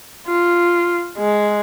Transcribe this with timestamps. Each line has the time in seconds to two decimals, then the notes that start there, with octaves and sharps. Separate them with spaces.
0.27 F4
1.18 G#3